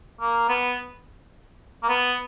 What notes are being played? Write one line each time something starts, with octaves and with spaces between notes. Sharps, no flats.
A#3
B3
A#3
B3